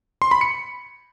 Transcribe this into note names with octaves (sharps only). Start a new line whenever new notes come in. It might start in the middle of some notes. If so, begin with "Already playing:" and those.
C6
B5
C#7